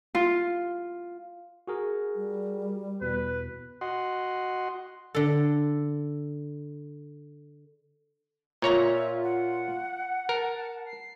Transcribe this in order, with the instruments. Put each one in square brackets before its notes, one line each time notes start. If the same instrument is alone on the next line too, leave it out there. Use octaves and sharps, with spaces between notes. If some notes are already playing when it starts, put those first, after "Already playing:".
[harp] F4
[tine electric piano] F#4 G#4 A#4
[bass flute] G3
[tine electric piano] E2 B2 [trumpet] B4
[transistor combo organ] F#4 D#5 F#5 C6
[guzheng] D3 A4
[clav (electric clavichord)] A#2 C#5 A#5 [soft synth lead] F4 [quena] E5
[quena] F#5
[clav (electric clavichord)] A#4 [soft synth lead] A5
[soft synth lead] C7